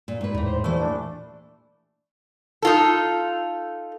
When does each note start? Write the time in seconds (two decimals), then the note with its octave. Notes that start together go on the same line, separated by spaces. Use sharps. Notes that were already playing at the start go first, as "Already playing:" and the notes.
0.08 A#2
0.21 G#2 B4
0.35 E2 A2
0.47 C5
0.64 C2 A#2 E3 A3
0.80 D4
2.62 D#4 F4 A4